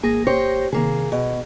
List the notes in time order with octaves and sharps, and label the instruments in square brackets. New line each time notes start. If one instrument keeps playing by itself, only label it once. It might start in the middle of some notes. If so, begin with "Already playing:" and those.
[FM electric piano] G#1 A#3 A#6 [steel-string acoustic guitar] G#4
[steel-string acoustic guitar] G4 C5 C#5
[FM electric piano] C3 D#3 [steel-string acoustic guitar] A#3 G#4
[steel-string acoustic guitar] B2 [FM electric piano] G#4